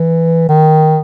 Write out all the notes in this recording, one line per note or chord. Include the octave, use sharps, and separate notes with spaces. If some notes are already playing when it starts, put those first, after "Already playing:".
Already playing: E3
D#3